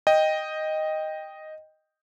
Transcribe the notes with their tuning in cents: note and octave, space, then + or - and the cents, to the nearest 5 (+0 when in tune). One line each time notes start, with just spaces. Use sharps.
D#5 +0 G5 +5